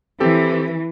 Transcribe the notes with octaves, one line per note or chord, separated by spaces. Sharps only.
E3 C4 G4 A4